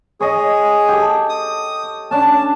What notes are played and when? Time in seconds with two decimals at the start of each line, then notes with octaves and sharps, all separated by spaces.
0.20 G#4 C#5 D#5
0.89 G4 A4
1.29 D#6
2.11 C#4 D4 A5